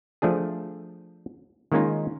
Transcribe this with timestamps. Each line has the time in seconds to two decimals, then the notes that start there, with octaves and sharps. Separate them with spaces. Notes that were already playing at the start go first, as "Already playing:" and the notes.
0.22 F3 A3 D4 G#4
1.72 D#3 G#3 A#3 C#4 D#4 F4